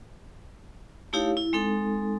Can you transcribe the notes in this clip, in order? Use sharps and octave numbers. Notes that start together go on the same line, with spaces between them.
A3 D#4 E4 G4 C#5 F5
E4
G#3 C4 D#4 A4